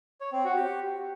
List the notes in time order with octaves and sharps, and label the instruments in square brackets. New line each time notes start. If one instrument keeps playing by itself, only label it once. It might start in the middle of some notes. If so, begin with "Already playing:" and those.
[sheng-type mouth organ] C#5
C4
F#4
G4